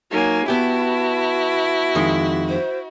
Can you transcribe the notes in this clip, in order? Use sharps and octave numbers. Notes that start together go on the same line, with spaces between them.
F#3 A#3 D#4 G#5
B3 E4 F#4 G4 A5
F2 D#3 G#3
C5